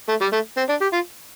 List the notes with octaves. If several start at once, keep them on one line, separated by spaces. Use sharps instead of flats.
A3
G3
A3
C4
D4
G4
F4